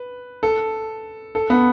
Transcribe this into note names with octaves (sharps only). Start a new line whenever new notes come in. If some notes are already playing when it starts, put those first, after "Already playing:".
Already playing: B4
A4
A4
B3